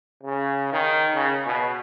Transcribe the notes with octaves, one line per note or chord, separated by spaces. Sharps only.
C#3
D#3
C#3
B2